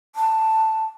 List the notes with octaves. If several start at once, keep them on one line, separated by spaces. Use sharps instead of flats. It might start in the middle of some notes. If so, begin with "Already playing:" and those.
A5